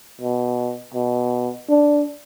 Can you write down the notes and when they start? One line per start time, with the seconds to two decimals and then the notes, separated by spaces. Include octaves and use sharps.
0.21 B2
0.94 B2
1.69 D4